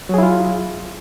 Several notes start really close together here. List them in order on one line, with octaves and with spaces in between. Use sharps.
F#3 G#4 E4 F4